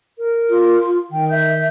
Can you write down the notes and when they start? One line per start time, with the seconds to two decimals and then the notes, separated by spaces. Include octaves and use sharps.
0.17 A#4
0.50 F4
1.10 D#3 G5
1.30 E5 G6